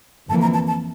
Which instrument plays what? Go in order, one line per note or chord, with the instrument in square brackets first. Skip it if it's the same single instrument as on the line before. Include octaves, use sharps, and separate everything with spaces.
[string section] G1 F2 E3 A#3 [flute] A5
[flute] A#5
A5
A5